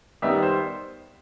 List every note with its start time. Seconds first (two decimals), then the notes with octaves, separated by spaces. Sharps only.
0.22 D#3 G3 B3 D#4 E5
0.43 C5